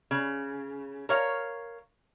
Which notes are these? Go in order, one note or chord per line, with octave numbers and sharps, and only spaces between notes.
C#3
A#4 C#5 F5